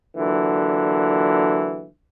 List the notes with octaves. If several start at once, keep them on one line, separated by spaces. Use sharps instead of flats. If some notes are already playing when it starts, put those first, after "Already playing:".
A#2 D3 E3 F#3